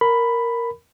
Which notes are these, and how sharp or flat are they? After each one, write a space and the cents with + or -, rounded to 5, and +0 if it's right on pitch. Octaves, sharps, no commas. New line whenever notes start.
A#4 +0 B5 +5